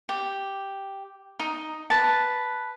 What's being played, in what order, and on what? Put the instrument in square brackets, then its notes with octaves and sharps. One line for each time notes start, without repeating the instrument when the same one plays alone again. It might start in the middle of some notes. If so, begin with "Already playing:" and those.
[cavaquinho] G4
D#4
B4 A5